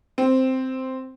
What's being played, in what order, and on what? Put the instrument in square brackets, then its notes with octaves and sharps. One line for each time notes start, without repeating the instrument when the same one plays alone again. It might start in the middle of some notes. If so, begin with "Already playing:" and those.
[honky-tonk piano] C4